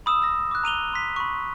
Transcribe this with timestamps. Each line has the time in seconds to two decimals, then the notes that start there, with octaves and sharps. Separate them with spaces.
0.06 B5 D#6 E6 E7
0.22 E6 A#6
0.51 D6 F#6
0.64 A#5 D#7 F7 G7
0.93 C6 B6
1.16 B5 C#6